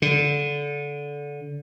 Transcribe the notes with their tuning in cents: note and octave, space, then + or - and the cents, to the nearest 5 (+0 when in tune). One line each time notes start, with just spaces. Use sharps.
D3 -20